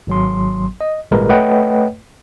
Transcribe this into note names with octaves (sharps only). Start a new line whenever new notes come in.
G#1 F#3 C6
D#5
G#1 A#2 G3 G#3 A#4 B4
A3 B4 C#5 D#5 F#5 G5